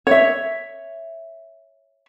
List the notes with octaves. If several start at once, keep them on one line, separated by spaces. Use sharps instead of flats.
C#5 E5